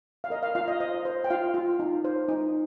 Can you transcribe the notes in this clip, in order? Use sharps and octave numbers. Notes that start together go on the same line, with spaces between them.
F5
A#4 D#5
F5
F4 F5
D#5
C5 D#5
C5
G5
F4 F5
F4
D#4
C5
D#4